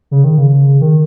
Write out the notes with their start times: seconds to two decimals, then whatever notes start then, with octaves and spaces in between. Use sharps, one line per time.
0.11 C#3
0.24 D#3
0.38 C#3
0.81 D#3